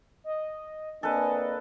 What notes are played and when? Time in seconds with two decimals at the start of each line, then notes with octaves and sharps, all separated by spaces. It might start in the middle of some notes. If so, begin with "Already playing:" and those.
0.24 D#5
1.03 A#3 C4 D4 A4 B4 D#5 G#5